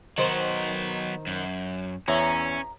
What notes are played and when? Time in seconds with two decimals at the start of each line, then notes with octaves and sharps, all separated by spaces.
0.18 D#3 F#3 B3 C5
1.27 F#2
2.08 E2 C#4 C#5 E5 A#5